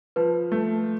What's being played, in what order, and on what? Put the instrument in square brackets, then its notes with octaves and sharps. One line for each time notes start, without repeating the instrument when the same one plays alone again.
[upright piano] F3 [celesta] B4
[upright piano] A3